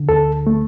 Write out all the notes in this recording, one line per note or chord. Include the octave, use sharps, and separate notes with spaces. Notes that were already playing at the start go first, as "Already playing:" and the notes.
Already playing: D3
D2 A4
A3